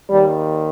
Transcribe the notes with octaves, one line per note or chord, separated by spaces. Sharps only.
D#2 D#3 G3